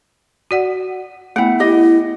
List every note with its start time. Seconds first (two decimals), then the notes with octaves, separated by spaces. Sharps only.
0.51 F#4 D5 F#5
1.36 A3 B3 E4 F#5
1.60 E4 G4 D#5